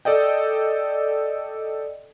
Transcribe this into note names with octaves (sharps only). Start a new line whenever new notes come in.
A4 D5 D#5 G5